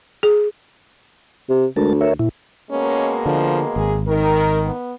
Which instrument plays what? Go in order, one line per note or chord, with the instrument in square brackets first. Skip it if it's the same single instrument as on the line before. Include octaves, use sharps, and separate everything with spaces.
[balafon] G#4
[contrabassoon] C3
[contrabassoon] D2 [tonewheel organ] G#3 A#4 A5
[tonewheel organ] A#4 C#5 E5
A#2 E4
[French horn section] B2 G#3 A#3 [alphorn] C#4
[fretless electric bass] D3 [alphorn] F3
[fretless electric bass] G#1 [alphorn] G#4
[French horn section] D#3 [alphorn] A#4
[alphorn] B3